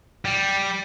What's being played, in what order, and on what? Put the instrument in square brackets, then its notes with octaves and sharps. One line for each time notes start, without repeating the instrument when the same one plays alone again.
[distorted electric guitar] G3